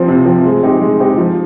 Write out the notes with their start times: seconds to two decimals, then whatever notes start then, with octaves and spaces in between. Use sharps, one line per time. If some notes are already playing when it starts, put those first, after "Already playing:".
Already playing: F3 C4
0.08 C3
0.26 F3 C4
0.45 G#3
0.63 C4 D#4 G4
0.81 G#3
1.00 C4 D#4 G4
1.17 F3